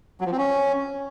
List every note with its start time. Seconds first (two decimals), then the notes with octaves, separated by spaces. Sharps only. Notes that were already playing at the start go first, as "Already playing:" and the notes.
0.20 F#3
0.26 F3
0.32 C4
0.38 C#4